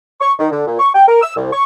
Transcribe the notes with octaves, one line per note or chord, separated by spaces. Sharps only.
C#6
D#3
D3
A#2
C#6
G5
A#4
E6
C2
C#6